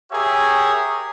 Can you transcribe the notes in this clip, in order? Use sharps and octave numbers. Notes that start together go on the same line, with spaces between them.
G4 G#4 A#4 C#5 E5